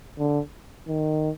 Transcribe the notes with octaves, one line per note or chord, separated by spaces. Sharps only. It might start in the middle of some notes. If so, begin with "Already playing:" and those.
D3
D#3